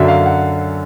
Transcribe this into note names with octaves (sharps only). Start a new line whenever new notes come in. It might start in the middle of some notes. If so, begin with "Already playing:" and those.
Already playing: F#2 D3 F#3 E5
F5
F#5